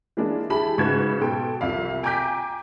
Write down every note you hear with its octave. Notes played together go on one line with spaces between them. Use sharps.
E3 G#3 A#3 D4
E4 G4 G#4 A5 B5
G#2 C#3 F#4 B4 C#6 G#6
B2 A4 G5 C6
C2 F2 E5 F5
G5 G#5 A#5 D6 G6 B6